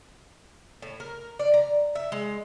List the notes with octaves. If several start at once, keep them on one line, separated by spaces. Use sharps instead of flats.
A2
A#4
D5
A#5
E5
G#3